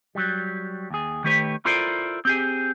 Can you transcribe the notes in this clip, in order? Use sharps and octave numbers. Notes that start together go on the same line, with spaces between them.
F#3 G3
D#2 G#4
D#3 A3 G4 B4 C#5
E4 F4 A4 A#4 C5 D5
C4 G4 G#4